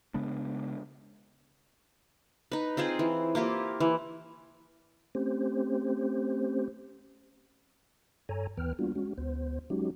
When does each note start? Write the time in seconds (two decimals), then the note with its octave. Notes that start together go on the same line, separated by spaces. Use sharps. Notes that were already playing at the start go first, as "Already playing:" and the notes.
0.14 C#3 G#3 B3 D4
2.52 D#4 B4
2.77 C4 F4 G#4 C5
2.99 E3
3.35 A#3 E4 F4 G4
3.80 E3
5.15 A3 C4 C#4 G4 C5
8.29 G2 A4 C#5 G#5 A#5
8.58 D#2 E3 B3 B4 G5 F6
8.79 G3 A#3 B3 D4 F4 F#4
8.95 G#3 C#4 F#4
9.18 D2 B3 C5
9.70 F#3 G#3 C#4 D#4 F#4 G4